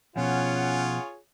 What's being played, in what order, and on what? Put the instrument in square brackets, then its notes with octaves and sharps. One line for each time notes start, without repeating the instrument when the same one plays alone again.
[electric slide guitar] B2 F3 [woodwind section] C#4 F#5 [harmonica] F4 G#4 C#5